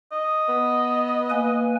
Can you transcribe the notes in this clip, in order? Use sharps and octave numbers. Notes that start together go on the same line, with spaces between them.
D#5
B3
A#3 B4 G#5